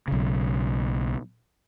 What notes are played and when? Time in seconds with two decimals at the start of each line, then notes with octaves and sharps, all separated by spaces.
0.08 B1 C#3